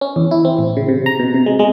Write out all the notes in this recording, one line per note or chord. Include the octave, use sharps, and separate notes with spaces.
C#4
E2
E4
C4
A1
C#3
C3
A#5
B2
C3
G#3
G#3